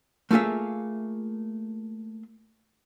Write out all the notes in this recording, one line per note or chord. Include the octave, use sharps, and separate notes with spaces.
A3 A#3 F4 G#4 E5